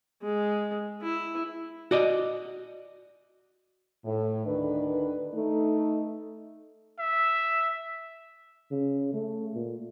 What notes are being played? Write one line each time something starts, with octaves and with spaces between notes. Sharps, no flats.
G#3
E4
F#4 D5 D#5
A2
D2 D#3 D4 B4
A3 D#4
E5
C#3
A3
A#2